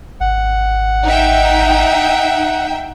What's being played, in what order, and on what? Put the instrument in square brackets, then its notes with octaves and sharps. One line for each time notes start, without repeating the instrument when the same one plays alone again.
[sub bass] G#1 [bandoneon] F#5
[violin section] D#4 E5 G5